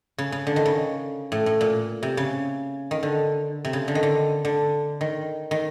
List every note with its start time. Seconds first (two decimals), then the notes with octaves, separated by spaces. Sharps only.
0.18 C#3
0.32 C#3
0.47 D3
0.56 D#3
0.66 C#3
1.32 A2
1.46 A2
1.61 A#2
2.03 C3
2.17 C#3
2.91 D#3
3.03 D3
3.65 C3
3.73 C#3
3.88 D3
3.95 D#3
4.03 D3
4.45 D3
5.01 D#3
5.51 D#3